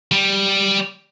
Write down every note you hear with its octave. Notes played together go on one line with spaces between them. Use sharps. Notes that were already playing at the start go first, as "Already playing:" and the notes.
G3